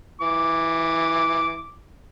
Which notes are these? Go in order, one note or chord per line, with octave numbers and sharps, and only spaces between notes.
E3 D6